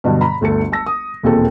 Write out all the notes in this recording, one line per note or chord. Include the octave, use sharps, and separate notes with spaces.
G2 B2 D3 F#3
A#5 B5
G1 D2 A4 C#7
A5 E6 A#6
D#6
E1 D#2 A#2 C4 A4